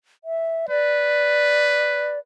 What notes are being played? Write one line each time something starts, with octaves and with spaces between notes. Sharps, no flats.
E5
B4 D5